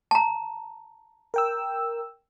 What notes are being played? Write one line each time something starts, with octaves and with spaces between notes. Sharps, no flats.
A5 A#5
A#4 G5 E6